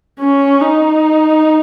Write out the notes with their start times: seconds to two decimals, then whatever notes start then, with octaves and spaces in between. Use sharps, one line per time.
0.20 C#4
0.61 D#4